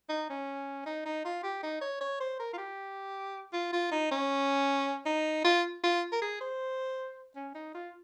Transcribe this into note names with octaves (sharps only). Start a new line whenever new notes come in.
D#4
C#4
D#4
D#4
F4
G4
D#4
C#5
C#5
C5
A#4
F4
G4
F4
F4
D#4
C#4
D#4
F4
F4
A#4
G#4
C5
C#4
D#4
F4